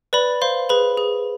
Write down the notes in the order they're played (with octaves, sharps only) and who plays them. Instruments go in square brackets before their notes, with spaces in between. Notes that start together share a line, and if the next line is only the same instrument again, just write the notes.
[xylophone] B4 D5 B5
C5 F5 C6
G#4 B4 B5
G#4